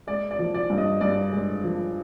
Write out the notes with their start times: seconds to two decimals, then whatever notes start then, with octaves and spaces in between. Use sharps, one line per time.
0.07 G#3 D5
0.31 D5
0.39 F3
0.54 D5
0.70 G2
0.78 D#5
1.01 G2 D5
1.32 G#3
1.64 F3